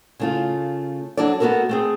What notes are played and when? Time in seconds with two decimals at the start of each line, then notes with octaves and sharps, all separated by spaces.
0.20 C#3 A3 F4
1.17 F#3 D4 A4 D5
1.40 A3 B3 C#4 F#4 A4 A#4
1.69 A3 C4 G#4